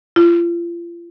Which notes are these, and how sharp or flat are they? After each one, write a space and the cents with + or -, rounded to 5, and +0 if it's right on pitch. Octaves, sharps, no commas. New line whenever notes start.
F4 -35